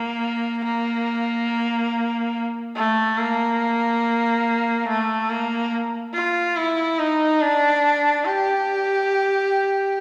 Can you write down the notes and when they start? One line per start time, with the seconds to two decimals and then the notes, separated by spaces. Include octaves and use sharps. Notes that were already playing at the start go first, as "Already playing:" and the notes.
Already playing: A#3
0.64 A#3
2.76 A3
3.18 A#3
4.88 A3
5.30 A#3
6.14 F4
6.57 E4
6.99 D#4
7.41 D4
8.25 G4